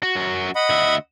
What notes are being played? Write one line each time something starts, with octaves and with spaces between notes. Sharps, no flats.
F#4
F#2 F#4
D#5 F#5 B5
D2 E5